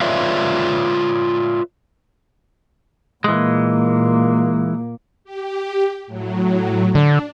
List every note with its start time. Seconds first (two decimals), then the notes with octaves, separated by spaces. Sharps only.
0.01 F4 B4 C#5 D5 E5 F5
3.24 A#2 E3 G#3 A#3
5.24 G4
6.07 A2 F#3
6.95 D3 D4